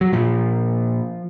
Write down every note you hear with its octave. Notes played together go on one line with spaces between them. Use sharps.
F#3
A#2 F3